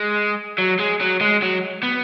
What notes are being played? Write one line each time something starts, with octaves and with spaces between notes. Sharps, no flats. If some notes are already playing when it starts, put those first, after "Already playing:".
Already playing: G#3
F#3
G#3
F#3
G#3
F#3
B3